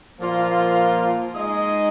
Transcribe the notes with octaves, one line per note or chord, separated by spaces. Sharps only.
A#2 F3 A#3 F4
G#3 D#4 G#4 D#5